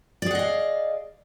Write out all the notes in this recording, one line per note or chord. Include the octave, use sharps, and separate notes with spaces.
G#4 D5 D#5 F5 F#5